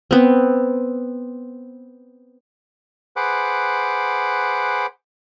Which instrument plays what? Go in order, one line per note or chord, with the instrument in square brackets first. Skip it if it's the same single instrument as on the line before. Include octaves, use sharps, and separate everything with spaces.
[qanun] B3 C4
[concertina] G#4 B4 C5 F#5 D6